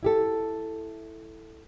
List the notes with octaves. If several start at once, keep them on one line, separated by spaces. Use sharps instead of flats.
E4 G4 A4